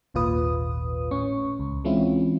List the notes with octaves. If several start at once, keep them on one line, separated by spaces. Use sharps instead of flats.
G#1 D#2 A#2 F4 B4 D#6
A2 C#4 C#6
C#2
E3 G#3 C4 C#4 E4 F4